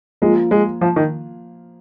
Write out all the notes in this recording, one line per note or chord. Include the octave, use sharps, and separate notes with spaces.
F3 G#3 A#3 F4
G#3
F3
D#3